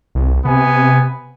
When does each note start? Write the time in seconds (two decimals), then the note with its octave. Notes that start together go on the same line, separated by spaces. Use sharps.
0.15 C2
0.45 C3 B3 G#5